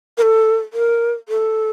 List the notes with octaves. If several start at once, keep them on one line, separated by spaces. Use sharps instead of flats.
A#4
A4
A#4
A4